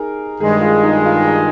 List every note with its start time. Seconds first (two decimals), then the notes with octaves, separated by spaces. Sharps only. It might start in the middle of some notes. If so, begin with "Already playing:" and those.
Already playing: D#4 G#4 A#4
0.40 G2 D#3 G#3 G#4
0.61 F4
0.83 D#4
1.05 F4
1.27 D#4